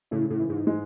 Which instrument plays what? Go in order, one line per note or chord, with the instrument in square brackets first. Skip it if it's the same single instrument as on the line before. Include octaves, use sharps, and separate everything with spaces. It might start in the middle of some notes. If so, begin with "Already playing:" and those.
[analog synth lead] A2 [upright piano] C#3
[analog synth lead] A2
[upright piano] E3
[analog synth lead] G#2
[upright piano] G#3